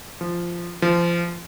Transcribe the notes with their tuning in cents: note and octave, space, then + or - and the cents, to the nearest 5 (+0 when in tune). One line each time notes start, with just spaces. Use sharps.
F3 -10
F3 -25